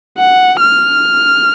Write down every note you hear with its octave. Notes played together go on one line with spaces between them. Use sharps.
F#5
F6